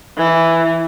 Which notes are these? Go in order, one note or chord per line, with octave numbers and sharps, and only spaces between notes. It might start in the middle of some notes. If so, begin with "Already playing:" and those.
E3